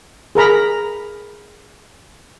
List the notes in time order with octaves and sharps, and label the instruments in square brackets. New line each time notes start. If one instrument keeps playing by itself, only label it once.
[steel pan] G#4 A#4 A#5 B5